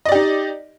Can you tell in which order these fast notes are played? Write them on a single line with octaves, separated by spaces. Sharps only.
D#5 D5 G4 D#4